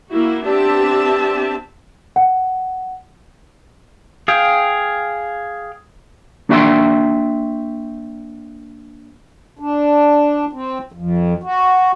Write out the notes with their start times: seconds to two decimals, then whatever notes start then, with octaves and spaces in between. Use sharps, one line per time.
0.11 A#3 E4 F#4
0.46 B3 C4 D4 G4 E5 A5
2.16 F#5
4.28 G#4 F5 G5
6.49 A#3 D4 F#4 E5 G5 C6
9.59 D4
10.53 C4
10.92 F2
11.43 F#4